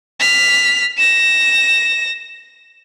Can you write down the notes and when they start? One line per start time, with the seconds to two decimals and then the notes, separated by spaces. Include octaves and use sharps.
0.20 F6 B6
0.98 A#6 E7